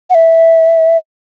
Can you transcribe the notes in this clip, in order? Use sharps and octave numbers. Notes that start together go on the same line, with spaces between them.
F#5
E5